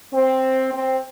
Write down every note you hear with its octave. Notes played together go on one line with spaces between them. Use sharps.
C4
C4